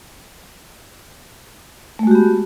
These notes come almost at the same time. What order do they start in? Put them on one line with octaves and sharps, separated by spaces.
A3 G#3 F#4 G4 B3